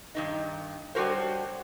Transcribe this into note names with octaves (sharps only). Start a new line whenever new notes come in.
G2 D#3 D#4
F#3 G3 D4 F#4 A#4 C5